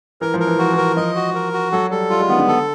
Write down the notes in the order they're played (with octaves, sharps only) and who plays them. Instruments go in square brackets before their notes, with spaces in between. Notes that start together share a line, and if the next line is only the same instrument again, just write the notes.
[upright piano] E3 [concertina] A#4
[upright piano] F3
[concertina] A#4
[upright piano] E3
[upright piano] F3 [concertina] F#4
[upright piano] E3
[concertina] A#4
[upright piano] F3 [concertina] D#5
[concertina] F#4
A#4
F#4
[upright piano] F#3 [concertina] A4
[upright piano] G3 [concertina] A4
[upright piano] G3 [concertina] F4
[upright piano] G#3
[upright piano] D#3 [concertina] B3
[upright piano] D3
[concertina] A4